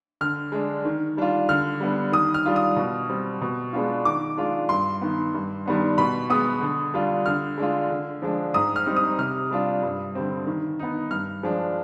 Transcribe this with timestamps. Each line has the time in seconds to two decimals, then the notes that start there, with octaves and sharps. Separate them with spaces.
0.21 D3 F6
0.52 G#3 D4
0.85 D#3
1.17 G3 D4 F4
1.49 D3 F6
1.80 G3 B3 D4
2.12 D#3 D#6
2.34 F6
2.45 G3 D4 F4
2.56 D#6
2.76 B2
3.09 G3 C4
3.42 B2
3.73 G#3 B3 D4 F4
4.05 D#3 D6
4.37 G#3 D4 F4
4.69 G2 C6
5.01 D#3 B3
5.34 G2
5.66 D#3 G3 B3 D4
5.98 B2 B5
6.30 G#3 B3 D#6
6.61 D3
6.94 G3 D4 F4
7.26 D3 F6
7.58 G#3 D4 F4
7.90 D3
8.22 F3 G#3 D4
8.54 G#2 D#6
8.76 F6
8.86 G3 C4 D#4
8.96 D#6
9.19 C3 F6
9.51 G3 D4 F4
9.82 G2
10.15 D3 G3 C4
10.47 D#3
10.79 B3 D#4
11.11 G2 F6
11.43 F3 G#3 D4